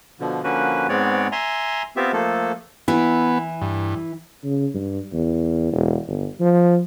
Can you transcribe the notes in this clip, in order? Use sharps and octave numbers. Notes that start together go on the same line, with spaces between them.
B2 D3 F3
D3 F3 A#3 C#4 F#4 B4
G#2 G#3 B3 C4 C#5 D5
E5 G#5 A#5 C6
B3 C4 F4 G4 E5
F3 A3 A#3 A4
E3 B3 E4
G2
C#3
G2
E2
E1
G1
F3